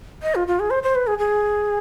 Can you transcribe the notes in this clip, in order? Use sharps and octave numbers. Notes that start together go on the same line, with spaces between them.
D#5
F4
F4
G#4
C5
C5
B4
G#4
G#4